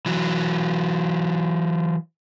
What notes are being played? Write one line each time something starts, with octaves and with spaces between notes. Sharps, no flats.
E3 F#3